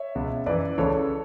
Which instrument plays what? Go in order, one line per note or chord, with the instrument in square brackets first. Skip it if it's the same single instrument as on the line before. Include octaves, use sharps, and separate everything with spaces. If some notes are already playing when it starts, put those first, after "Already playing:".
Already playing: [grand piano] C#5 E5
C#2 B2
F#2 E3 B4 D5
C#2 C#3 E3 A4 C#5